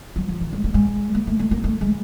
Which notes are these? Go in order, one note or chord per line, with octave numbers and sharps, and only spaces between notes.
F#3
F3
D#3
G#3
A3
G#3
A#3
A3
A3
A#3
A3
G#3